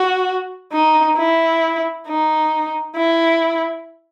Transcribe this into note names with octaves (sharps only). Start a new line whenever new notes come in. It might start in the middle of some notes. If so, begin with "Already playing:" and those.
Already playing: F#4
D#4
E4
D#4
E4